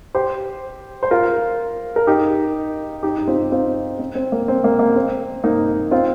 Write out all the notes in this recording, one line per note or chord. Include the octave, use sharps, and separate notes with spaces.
G4 C5
C5
F4 A#4
A#4
D#4 G4
D#4 G4
D#4
C4 F4
C4 F4
C4
C4
A#3
C4
A#3
A#3
C4
A#3 D#4
C4 F4